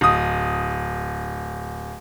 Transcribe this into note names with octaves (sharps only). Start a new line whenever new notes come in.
D1 D#6